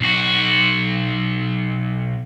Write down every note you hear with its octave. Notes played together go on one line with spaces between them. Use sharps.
B1 F#4